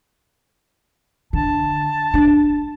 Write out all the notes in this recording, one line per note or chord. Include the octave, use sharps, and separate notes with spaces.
D3 A5
D4